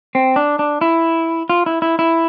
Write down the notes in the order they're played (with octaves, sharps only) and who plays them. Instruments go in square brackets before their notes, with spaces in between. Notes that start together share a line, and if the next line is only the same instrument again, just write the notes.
[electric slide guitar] C4
D4
D4
E4
F4
E4
E4
E4